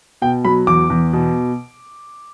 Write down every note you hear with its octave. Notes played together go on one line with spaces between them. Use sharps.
B2 G5
F#3 B5
E2 D6
E2
B2